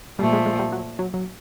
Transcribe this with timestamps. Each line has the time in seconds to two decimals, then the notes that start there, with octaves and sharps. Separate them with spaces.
0.19 A#2 F3 G3 A3
0.33 G#3
0.46 G#3
0.59 G3
0.72 F#3
0.99 F#3
1.14 F#3